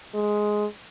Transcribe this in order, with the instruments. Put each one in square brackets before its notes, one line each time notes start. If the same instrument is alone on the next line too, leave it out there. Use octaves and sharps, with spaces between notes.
[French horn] G#3